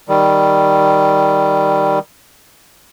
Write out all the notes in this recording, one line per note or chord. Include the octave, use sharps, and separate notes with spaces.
D#3 G3